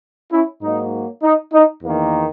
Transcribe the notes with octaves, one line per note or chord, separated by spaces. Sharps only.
C#4 E4
G#2 F#3 A#3 D#4
D#4
D#4
E2 D#3 A#3